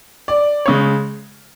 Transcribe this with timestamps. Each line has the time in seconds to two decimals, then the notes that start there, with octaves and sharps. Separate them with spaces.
0.28 D5
0.66 C#3 G#3 C#5